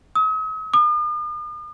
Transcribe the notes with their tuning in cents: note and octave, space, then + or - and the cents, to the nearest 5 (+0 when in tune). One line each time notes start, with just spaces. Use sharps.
D#6 +45
D#6 -45